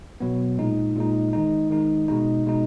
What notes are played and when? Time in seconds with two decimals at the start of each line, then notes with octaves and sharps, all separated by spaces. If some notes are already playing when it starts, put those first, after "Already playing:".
0.20 B2 F#3 B3
0.58 A#2 G#3 D#4
0.96 A#2 G#3 D#4
1.33 D#3 G#3 D#4
1.70 D#3 G#3 D#4
2.08 B2 G#3 D#4
2.46 B2 G#3 D#4